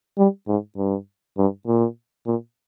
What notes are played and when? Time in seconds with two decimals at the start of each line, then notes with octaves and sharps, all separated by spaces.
0.18 G3
0.48 G#2
0.77 G2
1.38 G2
1.67 A#2
2.26 A#2